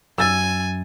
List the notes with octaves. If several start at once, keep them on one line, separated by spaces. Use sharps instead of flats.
F#2 G#5 E6 A6